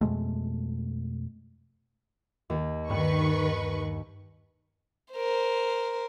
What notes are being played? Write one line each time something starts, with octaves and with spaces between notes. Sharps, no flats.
F2 B2 G#3 A3
D#2
G2 D#3 B4 C#6 F#6 D#7
A#4 C5